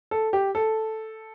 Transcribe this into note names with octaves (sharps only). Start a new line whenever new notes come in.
A4
G4
A4